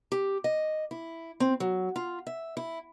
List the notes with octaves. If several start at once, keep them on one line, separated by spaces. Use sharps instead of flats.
G4
D#5
E4
C4
F#3
F4
E5
E4